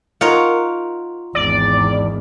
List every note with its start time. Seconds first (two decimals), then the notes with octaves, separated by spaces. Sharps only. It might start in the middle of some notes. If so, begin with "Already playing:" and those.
0.21 D#4 F4 A#4 C#5 F#5
1.35 G#1 E2 D5